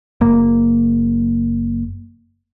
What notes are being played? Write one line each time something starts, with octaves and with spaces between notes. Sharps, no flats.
F#1 A#3